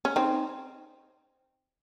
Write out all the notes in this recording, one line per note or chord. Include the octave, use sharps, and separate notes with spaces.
C#4
C4 D#4